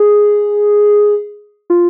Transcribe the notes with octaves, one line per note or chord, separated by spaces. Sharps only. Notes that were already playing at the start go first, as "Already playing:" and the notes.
Already playing: G#4
F4